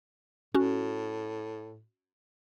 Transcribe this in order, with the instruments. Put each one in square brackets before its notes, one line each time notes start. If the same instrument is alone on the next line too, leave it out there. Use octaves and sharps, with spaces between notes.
[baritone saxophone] A2 [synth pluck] C#4 F#4